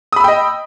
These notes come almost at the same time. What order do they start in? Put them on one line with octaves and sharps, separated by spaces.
D#6 B5 E6 G5 D#5